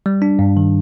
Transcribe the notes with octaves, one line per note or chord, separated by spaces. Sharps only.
G3
D4
G2
D#3